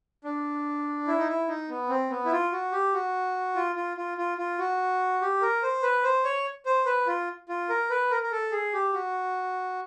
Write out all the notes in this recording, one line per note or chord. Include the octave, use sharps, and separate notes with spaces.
D4
E4
D#4
E4
D#4
B3
C4
B3
E4
F4
F#4
G4
F#4
F4
F4
F4
F4
F4
F#4
G4
A#4
C5
B4
C5
C#5
C5
B4
F4
F4
A#4
B4
A#4
A#4
A4
G#4
G4
F#4